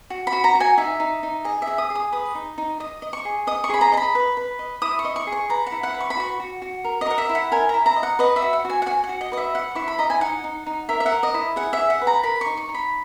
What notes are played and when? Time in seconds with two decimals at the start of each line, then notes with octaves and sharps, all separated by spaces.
0.10 F#4
0.27 B5
0.33 F#4
0.44 A#5
0.55 F#4
0.60 G#5
0.77 D#4 E5
1.00 D#4
1.23 D#4
1.45 G#4 D#5
1.62 E5
1.67 G#4
1.78 D#6
1.90 G#4
1.95 D#6
2.12 B4 D#6
2.35 D#4
2.58 D#4
2.80 D#5 D#6
3.02 D#5
3.13 C#6
3.25 G#4
3.47 D#5 D#6
3.64 C#6
3.69 G#4 B5
3.81 A#5
3.92 D#5 A#5
3.97 B5
4.15 B4
4.37 B4
4.59 D#5
4.82 E4 D#6
4.99 C#6
5.05 D#5
5.16 C#6
5.27 G#4
5.32 C#6
5.49 B4 A#5
5.67 F#5
5.72 E4
5.83 F#5
5.94 B4
6.00 C#6
6.10 B5
6.17 F#4 C#6
6.40 F#4
6.62 F#4
6.84 A#4
7.01 D#5
7.07 A#4 F#5
7.18 E5
7.29 E4
7.35 F#5
7.52 A#4 G#5
7.69 E4 A#5
7.86 A#5
7.96 D#5
8.03 F#5
8.19 B4 D#5
8.36 E5
8.42 F#4
8.53 F#5
8.65 F#4 G#5
8.82 F#5
8.86 F#4 G#5
9.04 F#5
9.09 F#4
9.21 D#5
9.32 B4 D#5
9.37 E5
9.54 D#5 F#5
9.75 E4 C#6
9.88 B5
9.99 D#5 A#5
10.10 G#5
10.21 D#4 F#5
10.44 D#4
10.67 D#4
10.89 A#4 E5
11.00 E5
11.06 F#5
11.12 A#4
11.23 D#5
11.34 E4
11.56 G#4 F#5
11.73 E5
11.79 G#4
11.90 F#5
12.01 B4
12.07 A#5
12.23 A#4 B5
12.41 C#6
12.46 D#4
12.57 C#6
12.69 D#4
12.75 B5